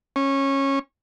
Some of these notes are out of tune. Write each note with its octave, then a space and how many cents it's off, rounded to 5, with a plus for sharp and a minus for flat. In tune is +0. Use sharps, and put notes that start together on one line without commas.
C#4 -20